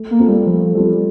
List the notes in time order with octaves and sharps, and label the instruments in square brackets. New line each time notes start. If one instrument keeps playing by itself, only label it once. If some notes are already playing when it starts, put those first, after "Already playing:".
Already playing: [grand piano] A3
[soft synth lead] A#3
[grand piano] C4 F4 A4
[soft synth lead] G3
[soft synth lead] F3 [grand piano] A3
[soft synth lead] G3 [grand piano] C4 F4 A4